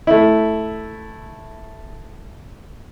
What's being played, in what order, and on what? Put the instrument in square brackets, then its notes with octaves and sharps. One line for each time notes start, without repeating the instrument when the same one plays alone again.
[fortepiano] A3 E4